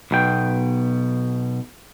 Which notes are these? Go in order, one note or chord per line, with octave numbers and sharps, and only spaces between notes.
B1 B2 G5